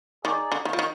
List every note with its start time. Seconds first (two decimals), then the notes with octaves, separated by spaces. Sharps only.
0.24 D#3 D#4 G#4 D5
0.52 D3
0.65 D#3
0.73 F3
0.79 D#3